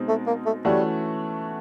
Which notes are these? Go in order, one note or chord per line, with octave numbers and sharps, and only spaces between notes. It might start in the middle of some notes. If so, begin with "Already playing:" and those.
Already playing: B2 G#3 C4 D#4
A3
A#3
A3
E3 G3 A3 C#4 F#4